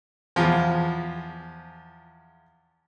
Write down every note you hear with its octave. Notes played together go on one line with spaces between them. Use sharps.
E2 F3